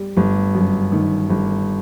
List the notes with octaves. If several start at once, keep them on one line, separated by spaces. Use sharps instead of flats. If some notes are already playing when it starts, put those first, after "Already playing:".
Already playing: G3
G1
F#2
D#3
G1